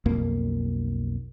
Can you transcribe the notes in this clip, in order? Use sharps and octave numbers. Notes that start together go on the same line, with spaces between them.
B1 F2 A#3